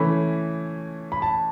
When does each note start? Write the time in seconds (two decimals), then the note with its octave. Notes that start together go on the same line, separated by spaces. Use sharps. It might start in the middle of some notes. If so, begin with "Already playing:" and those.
Already playing: E3 A3 C#4 B5
1.12 B5
1.22 A5